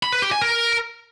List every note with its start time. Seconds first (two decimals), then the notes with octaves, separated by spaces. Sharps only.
0.03 B5
0.12 B4
0.22 G4
0.32 G#5
0.41 A#4